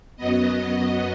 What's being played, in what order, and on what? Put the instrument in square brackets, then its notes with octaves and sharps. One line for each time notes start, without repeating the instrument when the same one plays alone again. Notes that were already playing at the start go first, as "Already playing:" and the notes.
[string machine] F#2 F#3 B3 D#5